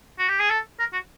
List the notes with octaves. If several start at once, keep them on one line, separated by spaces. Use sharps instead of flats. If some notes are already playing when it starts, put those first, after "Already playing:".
F#4
G4
G#4
A4
A#4
F#4